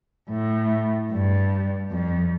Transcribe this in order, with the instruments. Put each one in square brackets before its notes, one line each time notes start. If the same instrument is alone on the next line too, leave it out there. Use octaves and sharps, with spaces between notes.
[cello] A2
G2
F2